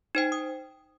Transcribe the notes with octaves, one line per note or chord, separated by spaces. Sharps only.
D#4 C5 G5
D#6